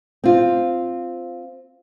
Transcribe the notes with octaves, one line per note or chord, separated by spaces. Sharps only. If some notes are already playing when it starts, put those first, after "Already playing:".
C4 F4